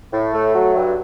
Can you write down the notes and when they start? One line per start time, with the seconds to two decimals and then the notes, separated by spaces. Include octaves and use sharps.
0.13 A2
0.33 A3
0.55 F#3
0.76 G2